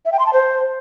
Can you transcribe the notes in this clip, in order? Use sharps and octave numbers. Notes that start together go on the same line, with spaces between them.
E5
G5
C6
A5
C5